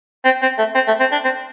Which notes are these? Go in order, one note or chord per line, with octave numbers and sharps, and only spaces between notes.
C4
C4
A3
C4
A3
C4
D4
C4